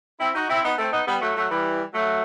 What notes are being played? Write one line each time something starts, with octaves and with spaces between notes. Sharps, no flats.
C4 E4
D#4 F#4
C4 E4
B3 D#4
A3 C4
B3 D#4
G3 B3
F#3 A3
F#3 A3
E3 G3
F#3 A3